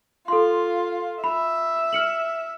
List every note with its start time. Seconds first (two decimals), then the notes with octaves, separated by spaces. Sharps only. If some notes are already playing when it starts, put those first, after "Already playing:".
0.28 F4 A4 C6
1.24 E5 B5
1.93 F6 C#7 F#7